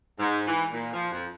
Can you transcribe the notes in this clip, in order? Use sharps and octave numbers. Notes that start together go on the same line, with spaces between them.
G#2
E3
A#2
F3
F2